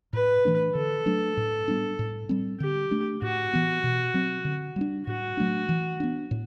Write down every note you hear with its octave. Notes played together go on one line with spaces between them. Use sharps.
A2 B4
E3 A3 D4
D3 A4
F#3 A3 D4
A2
G3 B3 D4
A2
G3 C4
D3 G4
A3 D4
A2 F#4
E3 B3
B2
F#3 C4
D3
G3 B3 D4
A2 F#4
F#3 A3 D4
E3
B3 D4
A2